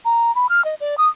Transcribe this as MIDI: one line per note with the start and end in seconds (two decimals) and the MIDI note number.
0.05 0.34 82
0.35 0.47 83
0.49 0.64 89
0.65 0.75 75
0.81 0.95 74
0.98 1.08 87